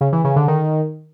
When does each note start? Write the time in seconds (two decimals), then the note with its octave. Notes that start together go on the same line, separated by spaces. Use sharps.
0.01 C#3
0.12 E3
0.24 C#3
0.36 D3
0.48 D#3